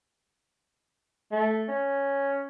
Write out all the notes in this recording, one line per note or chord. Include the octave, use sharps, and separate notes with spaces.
A3
C#4